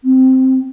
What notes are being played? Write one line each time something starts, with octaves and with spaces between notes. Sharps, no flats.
C4